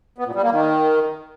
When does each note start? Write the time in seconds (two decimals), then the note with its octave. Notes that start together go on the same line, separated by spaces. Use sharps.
0.18 B3
0.27 A#2
0.35 G3
0.43 A#3
0.51 D#3